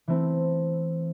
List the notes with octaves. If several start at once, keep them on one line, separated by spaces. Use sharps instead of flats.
E3 A3 C4 E4